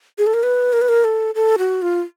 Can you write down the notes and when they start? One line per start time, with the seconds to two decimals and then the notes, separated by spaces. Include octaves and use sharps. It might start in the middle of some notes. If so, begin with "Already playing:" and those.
0.18 G#4
0.27 A4
0.34 A#4
0.43 B4
0.73 A#4
0.82 B4
0.89 A#4
1.04 A4
1.35 A4
1.58 F#4
1.82 F4